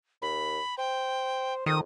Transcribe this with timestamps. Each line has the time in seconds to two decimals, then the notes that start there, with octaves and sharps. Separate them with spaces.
0.22 D#2 B5
0.78 C5 G5
1.66 F2 D#3 D#6